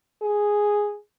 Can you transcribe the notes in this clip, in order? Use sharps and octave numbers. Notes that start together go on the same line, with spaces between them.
G#4